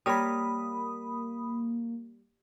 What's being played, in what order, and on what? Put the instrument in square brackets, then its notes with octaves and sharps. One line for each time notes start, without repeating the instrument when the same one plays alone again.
[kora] G3 A#4 C#5 [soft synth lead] A#3 [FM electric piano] B5 D#6